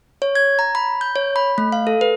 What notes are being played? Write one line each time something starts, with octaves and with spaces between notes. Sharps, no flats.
C#5
G#6
A#5
B5
G6
C#5
B5
A3
F5
A4
B4